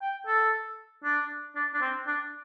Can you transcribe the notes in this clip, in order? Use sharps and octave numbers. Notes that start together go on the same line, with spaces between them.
G5
A4
D4
D4
D4
C4
D4